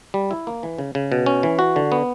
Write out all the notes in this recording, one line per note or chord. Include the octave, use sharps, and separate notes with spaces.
G3
E4
A#3
E3
C#3
C#3
B2
C#4
E3
F#4
D3
B3